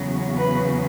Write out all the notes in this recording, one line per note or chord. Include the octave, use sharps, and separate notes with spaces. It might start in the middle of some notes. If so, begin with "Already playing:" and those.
Already playing: E2 C#3 F#3
B4